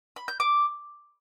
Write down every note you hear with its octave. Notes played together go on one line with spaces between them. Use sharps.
B5
G6
D6